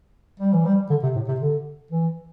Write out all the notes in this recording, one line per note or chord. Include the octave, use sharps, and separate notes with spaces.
G3
E3
G3
D3
C3
A2
C3
D3
E3